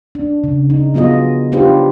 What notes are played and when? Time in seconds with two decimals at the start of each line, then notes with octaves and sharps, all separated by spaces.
0.15 D4
0.44 C#3
0.70 D#4
0.94 F#3 B3 F4 G#4 D#5
1.52 D4 D#4 F4 G4 B4 C5